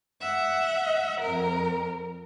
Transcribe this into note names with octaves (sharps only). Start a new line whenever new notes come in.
E5 F#5
F2 A#4